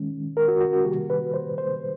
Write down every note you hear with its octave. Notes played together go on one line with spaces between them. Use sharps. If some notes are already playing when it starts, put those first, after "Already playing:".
Already playing: D#3 G#3 C#4
A#4
F#4
F#4
F#4
C3 D#3 G3 A#3 G4
B4
C5
C5